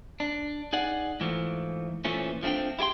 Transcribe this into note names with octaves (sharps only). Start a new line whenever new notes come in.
D4
D#4 G#4 D5 F#5
G#2 E3 F3 A3
A#2 E3 F3 A3 C#4
F3 A3 C4 D4 G5
E4 G4 G#4 G5 C6